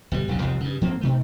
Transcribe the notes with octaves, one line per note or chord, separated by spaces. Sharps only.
G1 B2 G3
D#1 B1 F#2 C#3
C2 F2 G#2 C3
G2 C#3
G#2 F3 A#3 C4
B2 D#3 A3